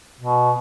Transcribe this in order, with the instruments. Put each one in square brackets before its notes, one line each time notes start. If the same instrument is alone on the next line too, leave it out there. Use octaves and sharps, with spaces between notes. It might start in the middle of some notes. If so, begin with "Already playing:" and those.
[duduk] B2